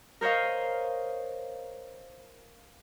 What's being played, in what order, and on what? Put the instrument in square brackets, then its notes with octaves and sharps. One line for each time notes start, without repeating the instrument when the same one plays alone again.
[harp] A#4 C5 C#5 D#5 F5